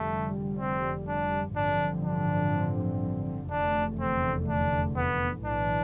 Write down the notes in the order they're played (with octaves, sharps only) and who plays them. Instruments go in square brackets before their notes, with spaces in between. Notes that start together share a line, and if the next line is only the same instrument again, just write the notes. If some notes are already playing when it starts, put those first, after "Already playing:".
Already playing: [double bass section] F1 F2 D3 G3 [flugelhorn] A3
[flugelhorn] C4
D4
[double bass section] A1 G2 D3 F3 C4 [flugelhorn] D4
[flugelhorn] D4
[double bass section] F1 E2 D3 A3 [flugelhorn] D4
[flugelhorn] C4
D4
B3
[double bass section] B1 A2 E3 [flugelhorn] D4